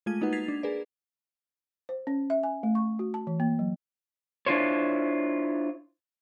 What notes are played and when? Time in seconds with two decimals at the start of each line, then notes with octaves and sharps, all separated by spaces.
0.06 G#3 A3 F4 G#6 D#7
0.21 A#3 D#4 F#4 B4 F#5
0.32 G#6 A6 B6 C7 F7
0.48 D4
0.63 G#4 A#4 B4 D5
1.89 C5
2.07 C#4
2.30 E5
2.43 G#5
2.63 A3
2.75 C#6
2.99 F#4
3.14 A5
3.27 E3
3.40 A#3
3.59 F#3
4.46 D4 E4 F4 C5 C#5